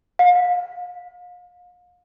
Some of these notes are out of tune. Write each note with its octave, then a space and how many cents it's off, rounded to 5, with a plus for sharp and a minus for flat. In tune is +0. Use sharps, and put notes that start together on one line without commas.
F5 +35